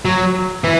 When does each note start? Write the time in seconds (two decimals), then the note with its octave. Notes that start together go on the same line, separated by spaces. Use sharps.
0.05 F#3
0.64 E3